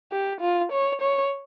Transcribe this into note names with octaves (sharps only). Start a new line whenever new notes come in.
G4
F4
C#5
C#5